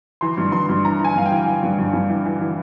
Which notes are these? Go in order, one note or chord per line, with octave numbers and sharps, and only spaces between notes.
E3 C6
G2
G2 C6
G2
E3 A#5
E3 G#5 A#5
G2 F5
G5
E3
E3 F5
G2
G2
G2
E3
E3
E3